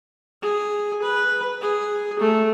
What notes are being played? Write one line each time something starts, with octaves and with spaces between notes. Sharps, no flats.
G#4
B4
G#4
A3